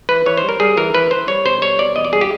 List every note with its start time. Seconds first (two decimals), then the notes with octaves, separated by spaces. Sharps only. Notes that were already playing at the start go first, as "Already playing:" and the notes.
0.09 E3 B4
0.26 E3 C#5
0.37 C5
0.43 G3
0.49 A#4
0.60 G3 G#4
0.77 E3 A#4
0.94 E3 B4
1.11 E3 C5
1.28 G3 C#5
1.45 B2 C5
1.62 G3 C#5
1.79 B2 D5
1.96 E2 D#5
2.05 D5
2.13 G3 G#4
2.21 G4